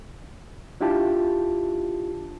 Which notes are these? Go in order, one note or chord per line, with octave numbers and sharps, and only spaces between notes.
D4 E4 F4 G4 A5